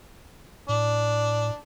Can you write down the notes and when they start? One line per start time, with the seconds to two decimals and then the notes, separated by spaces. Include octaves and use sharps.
0.69 A2 D4